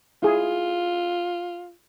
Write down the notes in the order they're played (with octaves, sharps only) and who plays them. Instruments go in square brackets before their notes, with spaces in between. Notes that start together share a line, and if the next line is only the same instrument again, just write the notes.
[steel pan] E4 G#4 [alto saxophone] F4